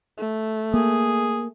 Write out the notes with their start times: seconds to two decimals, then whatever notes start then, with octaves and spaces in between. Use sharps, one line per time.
0.18 A3
0.74 A#3 G#4